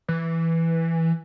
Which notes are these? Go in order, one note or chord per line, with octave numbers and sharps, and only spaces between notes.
E3